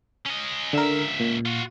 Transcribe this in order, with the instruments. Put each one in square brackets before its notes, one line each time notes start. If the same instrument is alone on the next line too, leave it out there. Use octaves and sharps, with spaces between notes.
[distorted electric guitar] C#4 D#5
[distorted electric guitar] C#2 E5 [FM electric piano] D3 A#4
[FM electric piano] A#2
[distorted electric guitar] F4 F#4